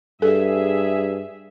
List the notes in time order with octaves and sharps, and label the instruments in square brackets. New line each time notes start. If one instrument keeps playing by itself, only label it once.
[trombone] G2 [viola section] G#4 E5 [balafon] A4